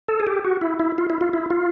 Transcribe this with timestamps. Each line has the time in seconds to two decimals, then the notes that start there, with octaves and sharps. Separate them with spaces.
0.08 A4
0.20 G#4
0.27 G4
0.45 F#4
0.61 E4
0.80 E4
0.98 F4
1.10 E4
1.21 F4
1.33 E4
1.50 F4